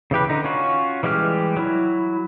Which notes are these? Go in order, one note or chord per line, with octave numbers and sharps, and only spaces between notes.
C#3 E3 G4 B4
D3 D#4
C#4 F4 F#4
E3 G3 G#3 G4 F6
F#3 E4